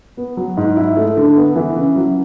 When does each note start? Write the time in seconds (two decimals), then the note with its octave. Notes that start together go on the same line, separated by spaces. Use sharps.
0.17 B3
0.37 F#3
0.57 G#2
0.77 E4
0.97 A3
1.17 D3
1.37 B3
1.56 E3
1.76 C#3
1.96 F#3